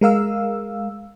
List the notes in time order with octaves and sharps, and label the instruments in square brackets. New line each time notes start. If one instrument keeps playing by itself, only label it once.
[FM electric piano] G#3 A#4 F5 E6